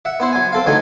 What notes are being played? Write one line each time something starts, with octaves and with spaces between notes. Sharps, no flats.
E5 F#5
B3 E4 C5
F#3 G#5
C4 A4 F5
D2 E3 F#3 A3 D#4 G#5